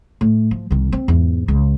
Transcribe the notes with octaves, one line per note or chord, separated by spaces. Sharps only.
A2
F3
C2 D#3
C4
E2 G#2
C#2